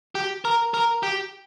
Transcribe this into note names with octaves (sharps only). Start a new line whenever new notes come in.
G4
A#4
A#4
G4